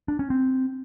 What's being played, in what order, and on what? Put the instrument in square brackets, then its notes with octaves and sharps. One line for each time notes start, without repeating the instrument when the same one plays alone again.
[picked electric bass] D4
C#4
C4